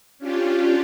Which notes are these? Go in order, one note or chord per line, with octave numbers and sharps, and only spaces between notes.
C#4 D4 F4 G4